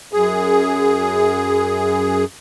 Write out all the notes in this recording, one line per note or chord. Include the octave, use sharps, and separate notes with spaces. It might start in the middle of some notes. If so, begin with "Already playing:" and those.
F#2 G#4